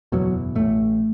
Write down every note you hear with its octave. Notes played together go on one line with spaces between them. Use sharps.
F#1 E2 B2 F#3
A1 A2 A3